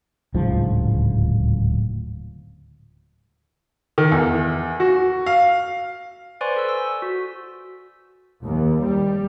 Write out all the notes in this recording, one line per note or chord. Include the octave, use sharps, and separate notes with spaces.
D1 C#2 G#2 F3
D#3
E2
F#4
F5
B4 C5 D5 G#5 C6 C#6
A4 E6
E6
F#4
D#2
G3